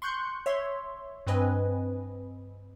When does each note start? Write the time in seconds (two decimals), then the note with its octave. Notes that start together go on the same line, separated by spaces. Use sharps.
0.02 C6 C#6 F#6 G6 C#7
0.46 C#5 E5 C6
1.27 G2 C4 B4 D#5 G#5